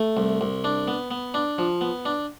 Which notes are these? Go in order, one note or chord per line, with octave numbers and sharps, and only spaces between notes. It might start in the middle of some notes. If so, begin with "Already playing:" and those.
Already playing: A3
C2
C2
D4
B3
B3
D4
F3
B3
D4